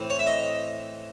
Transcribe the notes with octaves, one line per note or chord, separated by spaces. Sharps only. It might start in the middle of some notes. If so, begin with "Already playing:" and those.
Already playing: A2 E3 C4
C#5
E5
D#5